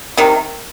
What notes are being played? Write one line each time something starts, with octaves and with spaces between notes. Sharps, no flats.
C3 D#3